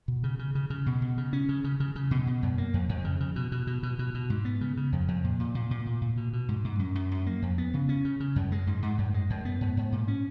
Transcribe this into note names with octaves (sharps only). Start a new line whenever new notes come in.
B2
C#3
C#3
C#3
C#3
B2
B2
C#3
C#4
C#3
C#3
C#3
C#3
B2
B2
F#2
A#3
F2
F2
C#3
C#3
B2
B2
B2
B2
B2
B2
G#2
B3
C#3
C#3
F2
F2
A#2
A#2
A#2
A#2
A#2
A#2
B2
B2
G#2
G#2
F#2
F#2
F#2
A#3
F2
B3
C#3
C#4
C#3
C#3
F#2
G#3
G#2
G#2
F#2
G#3
F#2
B3
G#2
G#2
A#2
C#4